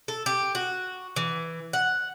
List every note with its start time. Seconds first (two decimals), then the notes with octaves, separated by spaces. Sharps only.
0.08 A4
0.26 G4
0.55 F#4
1.16 E3
1.73 F#5